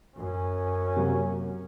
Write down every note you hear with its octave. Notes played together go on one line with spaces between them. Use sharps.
F#2 C#4
C3 F#3 A#3